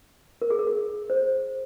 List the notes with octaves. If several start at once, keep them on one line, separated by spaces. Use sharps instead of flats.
A#4
G#4
A#4
G#4
C5